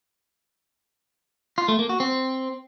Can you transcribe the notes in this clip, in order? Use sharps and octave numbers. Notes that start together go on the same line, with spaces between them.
F4
A3
A#3
F#4
C4